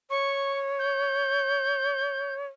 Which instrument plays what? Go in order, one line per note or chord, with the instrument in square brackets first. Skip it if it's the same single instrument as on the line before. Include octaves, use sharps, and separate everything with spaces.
[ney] C#5 [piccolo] C#6
[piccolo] G6